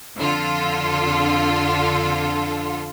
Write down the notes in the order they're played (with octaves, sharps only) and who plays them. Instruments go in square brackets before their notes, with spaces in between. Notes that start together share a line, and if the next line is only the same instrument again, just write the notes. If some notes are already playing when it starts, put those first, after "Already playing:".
[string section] F2 D3 F4 A4